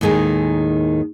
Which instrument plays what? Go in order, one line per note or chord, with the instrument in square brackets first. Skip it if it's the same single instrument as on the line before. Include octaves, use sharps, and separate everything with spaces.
[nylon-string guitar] D#2 A2 D#3 G#3 G#4